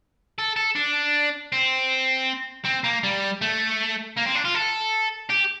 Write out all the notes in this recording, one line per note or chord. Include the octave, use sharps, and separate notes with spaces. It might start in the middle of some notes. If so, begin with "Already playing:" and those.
A4
A4
D4
C4
C4
A#3
G3
A3
A#3
C4
D4
F4
A4
G4